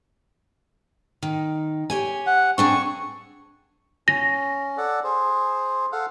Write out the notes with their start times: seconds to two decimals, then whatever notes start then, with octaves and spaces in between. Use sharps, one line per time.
1.22 D#3
1.90 G4 C#5 G#5
2.27 F#5
2.58 C4 D4 G#4 C#6
4.08 C#4 A#6
4.77 A4 D5 F#5
5.04 G#4 C5
5.92 A4 F5 F#5